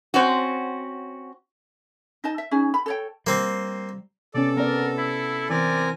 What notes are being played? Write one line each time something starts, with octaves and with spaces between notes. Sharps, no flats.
C4 C#4 F#4
D#4 D#5 A5
E5
C#4 D#4 G#4
B5
A4 C#5 G5
G3 A#3 C4
C3 B3 C#4 A4 D5
B3 A#4 D5
E4
E3 C4 A#4 D5 G#5